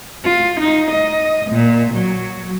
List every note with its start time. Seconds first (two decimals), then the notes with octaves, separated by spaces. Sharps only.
0.23 F4
0.59 D#4
0.91 D#5
1.50 A#2
1.94 F#3